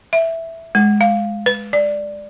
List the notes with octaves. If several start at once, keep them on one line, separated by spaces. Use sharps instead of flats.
E5
G#3
F5
B4
D5